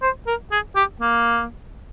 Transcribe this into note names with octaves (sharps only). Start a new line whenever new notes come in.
C5
A#4
G#4
G4
A#3